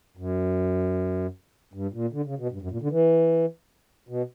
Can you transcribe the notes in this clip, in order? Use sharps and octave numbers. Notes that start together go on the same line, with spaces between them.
F#2
G2
A#2
D3
C#3
B2
G2
F#2
A#2
D3
E3
B2